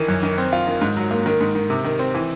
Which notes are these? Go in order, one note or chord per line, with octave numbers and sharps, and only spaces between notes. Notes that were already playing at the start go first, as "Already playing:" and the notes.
Already playing: D#3 E3
F#2
D#3
C4
F4
D#3
G#2
F#3
A#3
D#3
G#2
D#3
C3
D#3
C4
E3